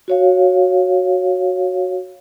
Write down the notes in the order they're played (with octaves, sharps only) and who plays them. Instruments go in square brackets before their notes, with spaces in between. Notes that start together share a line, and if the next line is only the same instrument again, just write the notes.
[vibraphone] F#4 C#5 F5